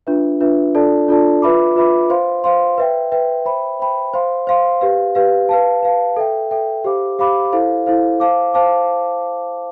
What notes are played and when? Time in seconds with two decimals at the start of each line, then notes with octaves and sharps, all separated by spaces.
0.07 D4 F4 B4 E5
0.40 D4 F4 B4 E5
0.74 D4 F4 A4 D5 A5
1.08 D4 F4 A4 D5 A5
1.42 F4 B4 E5 B5 D6
1.76 F4 B4 E5 B5 D6
2.10 C5 F5 C6
2.44 C5 F5 C6
2.78 B4 E5 G5
3.12 B4 E5 G5
3.45 C5 E5 G5 B5
3.79 C5 E5 G5 B5
4.14 C5 F5 C6
4.47 C5 F5 C6
4.81 G4 B4 F5
5.15 G4 B4 F5
5.49 B4 F5 A5
5.83 B4 F5 A5
6.17 A4 E5 G5
6.51 A4 E5 G5
6.84 G4 C5 F5 B5 D6
7.19 G4 C5 F5 B5 D6
7.52 E4 A4 C5 F5
7.86 E4 A4 C5 F5
8.20 C5 F5 A5 D6
8.54 C5 F5 A5 D6